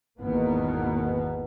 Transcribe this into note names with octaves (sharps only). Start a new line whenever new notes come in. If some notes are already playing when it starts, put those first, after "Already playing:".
G#1 E2 B2 D#3 A#3 B3